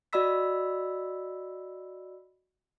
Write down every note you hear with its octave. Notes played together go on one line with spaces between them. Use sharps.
F#4 D5 D#5 B5 E6 B6